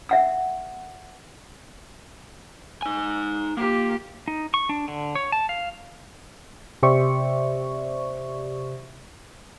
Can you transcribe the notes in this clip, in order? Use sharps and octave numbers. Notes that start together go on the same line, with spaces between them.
E5 F#5 E6
D#4 G#5
A#3 F4 G4
D#4
C#6
D4
D3
C#5
A5
F5
C3 G4 C5 D5 E5 C#6